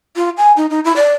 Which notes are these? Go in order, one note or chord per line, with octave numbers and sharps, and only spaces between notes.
F4
G#5
D#4
D#4
E4
D5